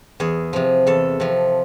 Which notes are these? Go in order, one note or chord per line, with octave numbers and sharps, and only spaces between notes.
E2 G#4
C3 F3
E2 A4
C3 F3